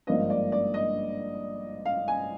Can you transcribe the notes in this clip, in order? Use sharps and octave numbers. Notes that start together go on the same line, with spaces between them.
G#1 G2 F3 A#3 D4 D#5
D5
D5
D#5
F5
G#5